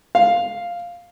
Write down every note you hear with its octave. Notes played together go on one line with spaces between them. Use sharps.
F5